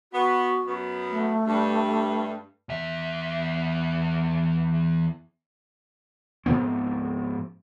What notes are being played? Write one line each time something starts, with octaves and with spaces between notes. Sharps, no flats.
B3 F#4
F#2 B3
A3
G2
E2 E5
G#2 F3 B3 C4